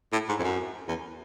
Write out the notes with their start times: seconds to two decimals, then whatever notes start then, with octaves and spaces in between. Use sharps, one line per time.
0.13 A2
0.29 G#2
0.39 F2
0.44 F#2
0.88 E2